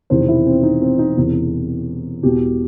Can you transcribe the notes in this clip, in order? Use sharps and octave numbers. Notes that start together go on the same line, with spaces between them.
E1 E2 C3 D#3 C5
E4
C4
D#4
C4
D#4
E1 E2 C3
E1 E2 B2 G4